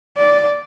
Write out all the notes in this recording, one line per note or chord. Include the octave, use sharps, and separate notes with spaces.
D5